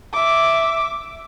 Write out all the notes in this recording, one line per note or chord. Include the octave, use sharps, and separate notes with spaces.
E5 D6